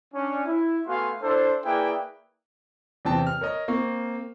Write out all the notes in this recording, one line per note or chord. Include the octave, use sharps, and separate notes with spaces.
C#4 D4
E4
A3 B3 F#4 F5 G#5 C6
D4 E4 A4 C5
A#3 E4 G#4 B4 D5 G5
E2 C3 C4 G5 A5
F6
A#4 C#5 D#5
A#3 C4 C#6